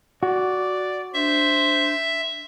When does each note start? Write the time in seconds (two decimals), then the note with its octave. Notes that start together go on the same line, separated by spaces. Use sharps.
0.23 F#4 D5
1.14 D4 C5 E5